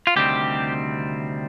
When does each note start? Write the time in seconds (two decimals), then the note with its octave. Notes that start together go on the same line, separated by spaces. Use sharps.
0.07 F4
0.16 D2 C3 D#3 G3 C4 G4